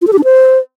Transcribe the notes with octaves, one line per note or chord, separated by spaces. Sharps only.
F4
A4
G4
D4
C5